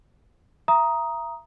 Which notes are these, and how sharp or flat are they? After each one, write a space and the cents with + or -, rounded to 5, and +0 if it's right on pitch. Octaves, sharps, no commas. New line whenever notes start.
E5 +35 A#5 +10 D#6 +5